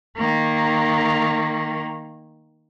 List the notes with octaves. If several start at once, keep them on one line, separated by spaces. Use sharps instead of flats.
D#3 A#3